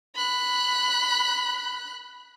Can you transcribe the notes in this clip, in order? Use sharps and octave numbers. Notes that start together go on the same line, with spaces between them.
B5 F#6